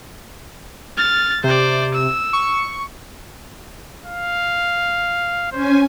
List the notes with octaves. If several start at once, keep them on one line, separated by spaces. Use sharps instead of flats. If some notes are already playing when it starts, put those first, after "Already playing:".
F6 A6
C3 C5 D5
E6
C#6
F5
C#4 C5 G#5